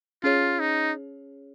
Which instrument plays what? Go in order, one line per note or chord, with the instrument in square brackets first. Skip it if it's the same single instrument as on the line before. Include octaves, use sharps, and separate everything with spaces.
[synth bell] C#4 G#4 C#5 [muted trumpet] F4
[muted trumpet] D#4